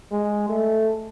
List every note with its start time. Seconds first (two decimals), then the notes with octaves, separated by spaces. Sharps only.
0.12 G#3
0.49 A3